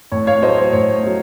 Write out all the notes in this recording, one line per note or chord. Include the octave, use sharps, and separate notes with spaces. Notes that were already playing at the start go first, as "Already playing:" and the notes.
A2 C#5
C#5 F5
F#3 A3 C5 D#5
C5
A2 C#5
F#3 A3